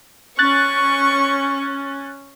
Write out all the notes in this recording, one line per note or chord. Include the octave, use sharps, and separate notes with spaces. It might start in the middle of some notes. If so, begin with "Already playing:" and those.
C#4 C#6 F#6 A6